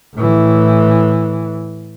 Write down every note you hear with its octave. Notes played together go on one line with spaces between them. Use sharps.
A2 E3